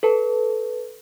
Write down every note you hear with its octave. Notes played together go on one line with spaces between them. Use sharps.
A4 B4 A5